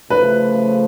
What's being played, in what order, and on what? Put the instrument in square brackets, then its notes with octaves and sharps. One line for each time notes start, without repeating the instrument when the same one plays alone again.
[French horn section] C#3 F3 A3 [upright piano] B4